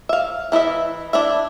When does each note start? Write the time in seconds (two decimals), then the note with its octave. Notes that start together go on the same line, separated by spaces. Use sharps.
0.09 E5 F5
0.52 E3 E4 D#5 E5
1.13 D4 E4 E5